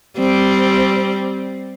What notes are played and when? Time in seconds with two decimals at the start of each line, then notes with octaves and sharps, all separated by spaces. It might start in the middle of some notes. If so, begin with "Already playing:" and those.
0.19 G3 C4